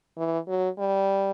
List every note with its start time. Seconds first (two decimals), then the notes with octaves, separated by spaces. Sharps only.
0.18 E3
0.48 F#3
0.78 G3